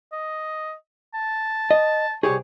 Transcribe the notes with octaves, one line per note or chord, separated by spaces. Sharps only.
D#5
A5
D#5
C2 G4 G#4 C#5